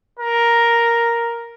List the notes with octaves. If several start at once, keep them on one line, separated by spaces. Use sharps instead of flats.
A#4